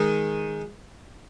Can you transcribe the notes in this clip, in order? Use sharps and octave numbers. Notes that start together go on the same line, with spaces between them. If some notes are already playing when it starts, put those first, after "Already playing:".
Already playing: D#3 G#3 D#4